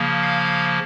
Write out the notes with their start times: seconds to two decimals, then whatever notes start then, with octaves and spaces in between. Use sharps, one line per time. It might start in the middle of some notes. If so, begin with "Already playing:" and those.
Already playing: C#3 F3 A#3
0.23 F5